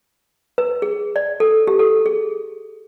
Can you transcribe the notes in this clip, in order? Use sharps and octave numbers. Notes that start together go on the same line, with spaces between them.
B4
G#4
D5
A4
G4
A4
G#4